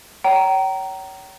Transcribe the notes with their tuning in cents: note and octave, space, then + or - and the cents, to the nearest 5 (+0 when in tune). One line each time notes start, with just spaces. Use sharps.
C#5 +15 G5 -40 A#5 +0